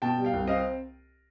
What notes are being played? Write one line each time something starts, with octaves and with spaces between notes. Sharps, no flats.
B2 G5 A5
G3
F5 G5
C2
C4 D#5 F5